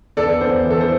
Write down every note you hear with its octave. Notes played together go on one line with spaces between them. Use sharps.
E2 A4 D5
E2 C5
E3
A4
C5